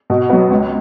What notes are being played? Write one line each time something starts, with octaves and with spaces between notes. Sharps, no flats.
B2
F#3 B3
C#2